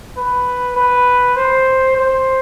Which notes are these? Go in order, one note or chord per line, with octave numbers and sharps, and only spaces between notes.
B4
B4
C5
C5